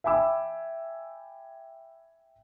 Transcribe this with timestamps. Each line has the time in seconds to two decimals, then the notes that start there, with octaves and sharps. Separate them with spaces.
0.04 E5 G5 G#5 B5 D6 E6